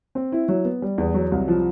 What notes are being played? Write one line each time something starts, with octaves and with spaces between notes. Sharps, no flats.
C4
E4
F#3
B3
G3
E2
F#3
C2
F3